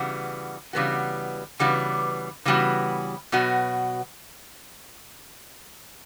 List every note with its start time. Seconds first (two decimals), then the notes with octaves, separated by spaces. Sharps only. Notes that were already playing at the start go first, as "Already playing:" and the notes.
Already playing: C#3 E3 G3 B3 F#4
0.73 C#3 E3 G3 B3 F#4
1.60 C#3 E3 G3 B3 F#4
2.45 C#3 E3 G3 B3 F#4
3.32 B2 F#3 B3 F#4